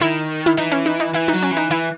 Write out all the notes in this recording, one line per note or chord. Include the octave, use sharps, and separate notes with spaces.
D#3 E4
E4
E3 D#4
C#4
D#4
D#4
E3 E4
F#3 D#4
C#4
E3
D#4
E3 E4